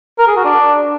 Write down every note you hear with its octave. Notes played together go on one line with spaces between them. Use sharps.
A#4
G#4
F#4
D4